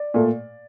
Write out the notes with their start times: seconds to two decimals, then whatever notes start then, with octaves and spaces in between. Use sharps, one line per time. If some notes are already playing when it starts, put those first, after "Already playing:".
Already playing: D5
0.14 A#2 A3